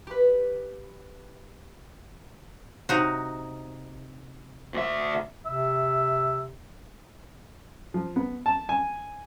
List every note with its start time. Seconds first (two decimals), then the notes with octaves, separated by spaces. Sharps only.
0.07 G4 B4
2.89 C3 D#4 F#4
4.74 D2 E5
5.46 C3 E5
7.94 F3
8.16 B3
8.46 A5
8.69 G#5